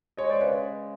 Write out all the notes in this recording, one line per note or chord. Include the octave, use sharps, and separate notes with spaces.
G#3 C#5 D#5
C5 D5
C#3 B4 C#5